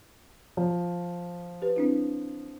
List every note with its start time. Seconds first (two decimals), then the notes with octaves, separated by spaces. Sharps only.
0.57 F3
1.62 G4 B4
1.76 C4 D4 E4